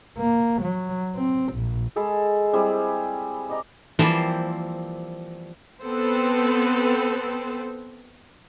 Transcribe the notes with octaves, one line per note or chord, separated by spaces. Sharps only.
A#3
F#3
C4
A#1
G#3 G#4 A4 B5
G3 C4 E4 G#4
D5 D#5 A#5
E3 F3 G3 A#3 C4 C5
B3 C4 A4 B4 C5